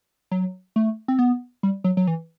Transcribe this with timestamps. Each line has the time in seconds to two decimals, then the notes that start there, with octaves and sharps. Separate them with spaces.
0.31 F#3
0.76 A3
1.08 C4
1.19 B3
1.63 G3
1.84 F#3
1.97 F#3
2.07 E3